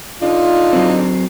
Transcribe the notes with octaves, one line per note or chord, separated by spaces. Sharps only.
D3 D4 D#4 F4
F#3 C4